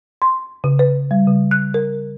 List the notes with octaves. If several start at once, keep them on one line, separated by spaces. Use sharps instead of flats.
C6
C#3
B4
G3
C#3
F#6
A#4